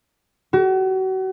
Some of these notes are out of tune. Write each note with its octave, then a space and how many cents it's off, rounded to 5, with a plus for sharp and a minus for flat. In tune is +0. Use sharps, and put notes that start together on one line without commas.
F#4 +35